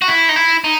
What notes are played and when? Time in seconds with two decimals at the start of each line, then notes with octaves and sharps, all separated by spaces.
0.02 F#4
0.08 E4
0.29 D#4
0.36 E4
0.64 D#4